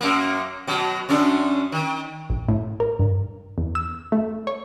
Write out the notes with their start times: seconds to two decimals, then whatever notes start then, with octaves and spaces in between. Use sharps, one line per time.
0.01 F#2 A#3
0.67 B2 F#3
1.09 F#2 C#4 D4
1.72 D#3
2.30 A#1
2.49 A2
2.80 A#4
2.99 G2
3.58 E2
3.75 E6
4.12 A3
4.47 C#5